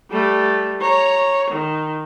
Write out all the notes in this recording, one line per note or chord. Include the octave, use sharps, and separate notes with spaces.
G3 A3
C#5 A#5
D#3